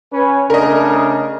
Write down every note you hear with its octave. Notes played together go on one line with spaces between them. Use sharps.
C#4 B4
C#3 A3 D4 A#4 D#5